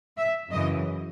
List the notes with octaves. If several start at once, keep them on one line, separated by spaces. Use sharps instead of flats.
E5
F#2 C#3 E3 D#5